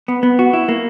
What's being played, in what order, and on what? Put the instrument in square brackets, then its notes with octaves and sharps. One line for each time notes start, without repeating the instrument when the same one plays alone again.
[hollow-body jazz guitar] B3
B3
F#4
E4
A#3